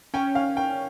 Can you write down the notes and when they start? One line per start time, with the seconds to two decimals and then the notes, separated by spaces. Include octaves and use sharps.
0.14 C#4 G5
0.35 F5
0.57 G5